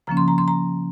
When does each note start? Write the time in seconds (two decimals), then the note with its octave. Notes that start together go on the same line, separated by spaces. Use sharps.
0.07 C#3 F3 A#3 C#4 A#5
0.17 C6
0.28 A#5
0.38 C6
0.48 A#5